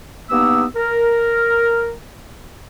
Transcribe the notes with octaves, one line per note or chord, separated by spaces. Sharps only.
G2 A#3 B3 D#4 E6
A#4